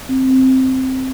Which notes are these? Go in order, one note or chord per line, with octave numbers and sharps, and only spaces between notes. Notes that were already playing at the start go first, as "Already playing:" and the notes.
C4